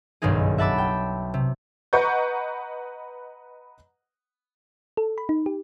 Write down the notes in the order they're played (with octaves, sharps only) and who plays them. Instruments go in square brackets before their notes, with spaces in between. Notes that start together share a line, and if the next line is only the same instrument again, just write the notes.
[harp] F#1 B1 G2 D#3 D#4 G#4
E5 F#5 A5 B5 D6 E6
G5
C3
[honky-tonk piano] B4 D#5 F#5 A#5 C#6 G6
[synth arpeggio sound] A4
B5
D#4
G4